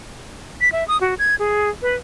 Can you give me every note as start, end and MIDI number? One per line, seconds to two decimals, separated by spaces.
0.61 0.72 95
0.72 0.87 76
0.88 1.00 87
1.01 1.15 66
1.19 1.35 92
1.39 1.70 68
1.82 1.95 71